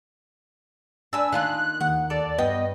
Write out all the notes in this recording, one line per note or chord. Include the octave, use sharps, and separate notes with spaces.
D4 B4 G#5 A5 E6
D#3 A#3 F4 F#6
D#2 F#5
A4 D5
G2 B3 D#5 G5